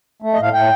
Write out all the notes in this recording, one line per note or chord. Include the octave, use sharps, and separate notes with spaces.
A3
D#5
A2 F5
A2 G5